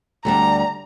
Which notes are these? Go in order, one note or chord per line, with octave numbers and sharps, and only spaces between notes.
D2 G3 D4 A#5